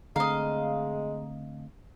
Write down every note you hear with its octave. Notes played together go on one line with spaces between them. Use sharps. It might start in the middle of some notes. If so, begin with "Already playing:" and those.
D3 G#3 A3 C4 D#5 F5 A#5